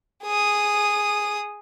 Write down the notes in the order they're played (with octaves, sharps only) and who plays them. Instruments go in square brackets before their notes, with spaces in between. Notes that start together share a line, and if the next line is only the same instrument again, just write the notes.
[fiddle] G#4 D#6